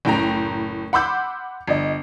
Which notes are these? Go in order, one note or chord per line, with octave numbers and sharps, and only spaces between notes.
F#1 A2 G5 A#5
F#5 B5 C6 D6 E6 G6
G1 D#5